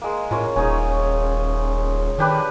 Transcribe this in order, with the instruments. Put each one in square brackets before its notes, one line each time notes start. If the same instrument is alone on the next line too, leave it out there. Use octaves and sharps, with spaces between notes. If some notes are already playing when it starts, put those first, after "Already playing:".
[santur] G#3 A#3
[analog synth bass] A2 [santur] A#3 C#4 F4
[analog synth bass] D#1 [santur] C#4 D#4 G#4
[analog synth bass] D#3 [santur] D4 G4 B4